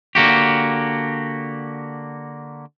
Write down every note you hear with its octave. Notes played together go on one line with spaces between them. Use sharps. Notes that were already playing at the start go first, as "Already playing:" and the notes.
D3 A#3 F#4 G4